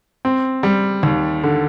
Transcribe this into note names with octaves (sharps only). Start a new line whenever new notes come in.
C4
G3
D#2
D3